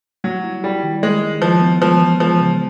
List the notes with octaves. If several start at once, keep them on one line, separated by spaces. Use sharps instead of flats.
F#3 G3
E4
G3 E4
D#3
D#3 G#3
D#3
F3 G3
B3
F3 G#3
E3
F3 G#3
C#3